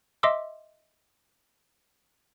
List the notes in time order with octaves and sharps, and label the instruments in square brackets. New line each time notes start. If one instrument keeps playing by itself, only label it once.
[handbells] D#5 E5 C6 D6 E6